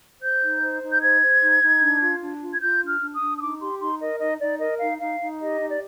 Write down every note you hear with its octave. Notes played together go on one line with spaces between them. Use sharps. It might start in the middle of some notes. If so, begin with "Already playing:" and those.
C5 G6
D#4
C5
D#4
G6
C5 G#6
C5
D#4
D#4
D4
F4
D4
F4
G#6
F4 G6
D4
F6
D4
D#6
D4
D#6
D#4 D6
G4 C6
D#4 C6
A#4 D#5
D#4 D#5
D#4 D5
A#4 D#5
D#4 F5
D#4 F5
D#4
G4 D#5
D#4
D5